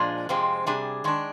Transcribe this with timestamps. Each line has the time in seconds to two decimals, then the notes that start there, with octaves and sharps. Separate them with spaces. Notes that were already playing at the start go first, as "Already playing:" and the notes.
Already playing: A#2 F3 G#3 D4
0.29 F2 C3 F3 G#3 C4
0.66 C3 G3 D4 G#4
1.04 D#3 G#3 D4